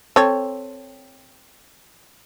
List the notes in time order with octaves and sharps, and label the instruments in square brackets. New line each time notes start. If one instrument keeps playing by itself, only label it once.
[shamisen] C4 A4 C#5